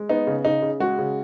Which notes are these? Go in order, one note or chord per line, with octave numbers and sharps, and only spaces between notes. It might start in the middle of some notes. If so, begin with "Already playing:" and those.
Already playing: G#3
B3 D#4
C#3
C#3 D#4
C#3
G#3 F#4
C#3